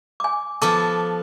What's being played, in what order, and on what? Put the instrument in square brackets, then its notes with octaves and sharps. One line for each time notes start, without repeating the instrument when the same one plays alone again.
[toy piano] G#5 D6
[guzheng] F3 B3 A4 [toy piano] A5 D6